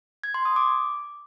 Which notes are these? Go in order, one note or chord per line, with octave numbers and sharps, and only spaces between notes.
G#6
C6
D#6
D6